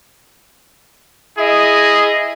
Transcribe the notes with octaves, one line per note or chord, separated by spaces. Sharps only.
E4 G#4 D#5